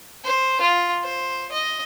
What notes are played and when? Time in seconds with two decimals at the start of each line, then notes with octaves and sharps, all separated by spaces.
0.24 C5
0.61 F4
1.04 C5
1.52 D#5